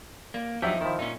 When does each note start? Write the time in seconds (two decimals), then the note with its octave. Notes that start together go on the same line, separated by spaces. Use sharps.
0.34 A#3 D5
0.62 F3 F#3 D4 D#4 G4 E5
0.81 D#3 F3 E4
0.99 A#2 C#4 D#4